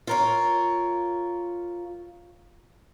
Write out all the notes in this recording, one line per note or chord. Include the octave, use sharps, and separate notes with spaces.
F4 A#4 C#5